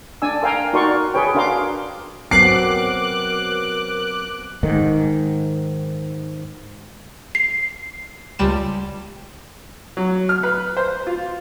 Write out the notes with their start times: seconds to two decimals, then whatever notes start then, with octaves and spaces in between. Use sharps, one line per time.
0.22 D4 D5 G#5 E6
0.43 A#4 F5 G5 G#5 A#5
0.73 D#4 F#4 A#4 D5 C6 C#6
1.14 G#4 B4 C#5 G5
1.35 D4 F#4 A#4 F5 C6 D6
2.31 F#3 B3 C4 A#4 D6 F#6 C7
4.63 G#2 D#3
7.35 C7
8.39 C#2 G3 E7
9.97 F#3
10.29 F6
10.43 B4
10.77 C5
11.07 F4